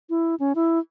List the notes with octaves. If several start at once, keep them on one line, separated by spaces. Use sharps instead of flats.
E4
C#4
E4